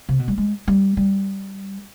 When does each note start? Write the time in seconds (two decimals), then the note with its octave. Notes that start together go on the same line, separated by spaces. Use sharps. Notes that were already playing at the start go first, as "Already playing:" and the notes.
0.09 C3
0.19 B2
0.28 G3
0.38 G#3
0.68 G3
0.97 G3